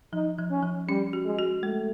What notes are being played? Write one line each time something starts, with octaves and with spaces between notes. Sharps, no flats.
F3 D#4
F3
C#4
F3
G3 C#4
F#4
G#3
F#4
G#3 A3